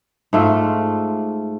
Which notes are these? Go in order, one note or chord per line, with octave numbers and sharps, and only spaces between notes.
G#2 A3 F4